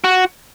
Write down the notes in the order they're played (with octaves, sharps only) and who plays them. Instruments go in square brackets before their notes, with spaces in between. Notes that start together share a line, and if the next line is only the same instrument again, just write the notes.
[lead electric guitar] F#4